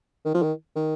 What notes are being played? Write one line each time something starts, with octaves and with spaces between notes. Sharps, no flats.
D#3
F3
D#3
D#3